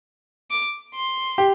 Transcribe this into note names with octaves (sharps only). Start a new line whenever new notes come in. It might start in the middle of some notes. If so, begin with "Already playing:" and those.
D6
C6
G4